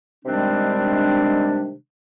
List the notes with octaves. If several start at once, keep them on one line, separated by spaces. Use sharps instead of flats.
C3 D#3 G3 G#3 C4 D4